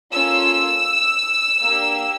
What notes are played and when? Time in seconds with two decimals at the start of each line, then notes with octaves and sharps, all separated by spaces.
0.12 A#3 C#4 F4 A4 E6
1.62 A#3 D4 G4